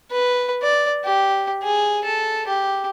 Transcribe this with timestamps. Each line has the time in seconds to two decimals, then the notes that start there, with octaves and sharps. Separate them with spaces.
0.11 B4
0.63 D5
1.05 G4
1.63 G#4
2.04 A4
2.47 G4